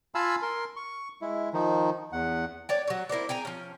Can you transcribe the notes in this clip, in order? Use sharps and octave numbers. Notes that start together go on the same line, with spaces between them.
F4 F5 G#5 A5 B5 E6
A#4 C6
C#6
G#3 E4
D#3 F3 D#4
E2 F#5
C#5 D5 G5
F#3 C#5
E4 A#4 C5 D5
G#4 G5 G#5 A#5
F3 C#4